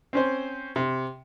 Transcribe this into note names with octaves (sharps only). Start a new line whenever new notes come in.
C4 C#4 C5
C3